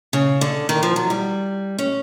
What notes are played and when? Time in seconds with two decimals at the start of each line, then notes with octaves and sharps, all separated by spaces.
0.13 C#3
0.41 D3
0.69 D#3
0.83 F3
0.96 F#3
1.10 G3
1.79 C#4